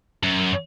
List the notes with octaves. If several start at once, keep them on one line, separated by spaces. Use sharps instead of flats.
F#2